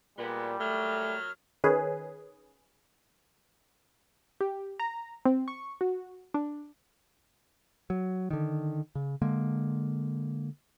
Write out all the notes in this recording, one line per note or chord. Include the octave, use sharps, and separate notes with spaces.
A#2 G3 G#3 B3
A#2 F#3 A3 F6
D#3 C#4 G#4 B4
G4
A#5
C4
C#6
F#4
D4
F#3
D3 D#3
C#3
D3 G#3 A#3